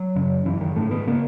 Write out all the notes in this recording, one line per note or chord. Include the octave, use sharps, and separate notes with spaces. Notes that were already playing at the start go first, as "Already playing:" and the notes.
Already playing: F#3
F#2 C#3
F#2 C#3 E3
D#3
G#2 A3
B3
C#3 A#3